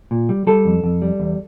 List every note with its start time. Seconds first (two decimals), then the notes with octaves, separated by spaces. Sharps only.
0.11 A#2
0.29 G3
0.47 G3 A4
0.65 F2
0.84 F2
1.02 G3
1.20 E2